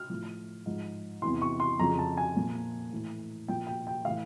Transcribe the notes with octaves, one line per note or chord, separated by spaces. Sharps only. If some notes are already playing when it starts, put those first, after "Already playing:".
Already playing: F6
A2 F3
G#2 F3
E2 C3 E3 C6
C#6
C6
F2 C#3 F3 A#5
A5
G#5
A#2 F3
A2 E3
A#2 F3 G5
G5
G5
A2 E3 F5